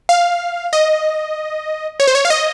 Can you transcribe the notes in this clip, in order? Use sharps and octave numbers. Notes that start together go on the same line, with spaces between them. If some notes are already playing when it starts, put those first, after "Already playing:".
F5
D#5
C#5
C5
C#5
F5
D#5